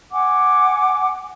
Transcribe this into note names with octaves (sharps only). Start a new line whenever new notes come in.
F#5 G#5 D6